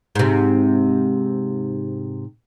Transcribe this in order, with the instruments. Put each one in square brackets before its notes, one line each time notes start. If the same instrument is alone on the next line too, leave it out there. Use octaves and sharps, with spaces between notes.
[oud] G#2 C3